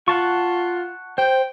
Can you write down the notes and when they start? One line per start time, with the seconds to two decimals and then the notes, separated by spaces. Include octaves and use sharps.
0.08 F4 F#5 A5 C#6
1.18 C5 G5